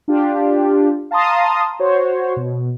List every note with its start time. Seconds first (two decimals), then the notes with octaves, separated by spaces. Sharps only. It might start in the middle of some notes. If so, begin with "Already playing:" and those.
0.08 D4 F4 G4
1.11 F5 A5 A#5 C6 D#6
1.79 F#4 C5 C#5
2.36 B2